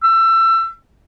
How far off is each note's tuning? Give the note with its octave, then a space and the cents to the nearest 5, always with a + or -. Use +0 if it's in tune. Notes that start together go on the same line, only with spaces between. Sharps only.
E6 +25